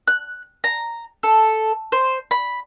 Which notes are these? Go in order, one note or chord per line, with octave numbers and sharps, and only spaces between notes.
F#6
A#5
A4
C5
B5